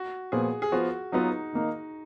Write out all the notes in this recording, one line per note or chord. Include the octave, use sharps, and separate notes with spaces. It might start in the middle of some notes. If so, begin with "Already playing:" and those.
Already playing: F#4
A#2 F3 B3 G#4
G#4
F3 B3 F4 F#4
F#3 B3 D#4 F4 B4
D#3 A#3 D#4